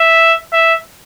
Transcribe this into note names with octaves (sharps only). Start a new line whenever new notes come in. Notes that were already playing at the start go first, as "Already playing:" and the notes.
Already playing: E5
E5